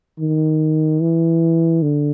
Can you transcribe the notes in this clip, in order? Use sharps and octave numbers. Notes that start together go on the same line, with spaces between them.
D#3
E3
D3